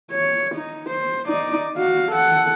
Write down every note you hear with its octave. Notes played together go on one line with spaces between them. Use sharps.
C#5
D#4
C5
D#4 D5
F#4 F5
A4 F#5